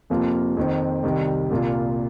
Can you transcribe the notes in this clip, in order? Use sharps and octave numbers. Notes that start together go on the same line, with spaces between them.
F2 C3 F3 A#3 F4
F2 D#3 C4
C2 C3 D#3 G3
C2 A#2 A#3 F4